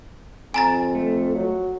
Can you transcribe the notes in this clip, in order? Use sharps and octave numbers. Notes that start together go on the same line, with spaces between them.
F2 G#5 A#5 A6
A3
F#3